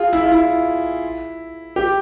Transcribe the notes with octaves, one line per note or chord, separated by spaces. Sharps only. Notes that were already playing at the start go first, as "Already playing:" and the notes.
Already playing: F4 G#4
E4
F4
E4
G4